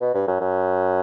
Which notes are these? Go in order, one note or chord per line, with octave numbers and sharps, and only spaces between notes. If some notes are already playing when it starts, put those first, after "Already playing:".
B2
G2
F#2
F#2